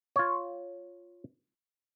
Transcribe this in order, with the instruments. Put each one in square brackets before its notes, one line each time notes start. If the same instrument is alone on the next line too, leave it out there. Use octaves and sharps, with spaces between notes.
[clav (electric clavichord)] F4 C#5